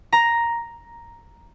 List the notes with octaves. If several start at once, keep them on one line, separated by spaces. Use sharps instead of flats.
A#5